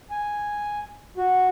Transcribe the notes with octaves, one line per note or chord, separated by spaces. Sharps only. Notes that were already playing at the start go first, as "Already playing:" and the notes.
G#5
F#4